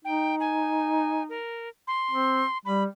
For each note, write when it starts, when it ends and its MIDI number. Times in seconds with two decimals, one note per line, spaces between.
0.05 1.38 63
0.05 0.35 79
0.40 1.23 80
1.29 1.69 70
1.87 2.58 84
2.11 2.44 60
2.65 2.85 55
2.65 2.84 83